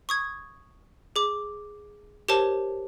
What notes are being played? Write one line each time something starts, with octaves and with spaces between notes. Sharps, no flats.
C#6 D#6 G#6
G#4 D6
G4 A#4 C5 C#5 A5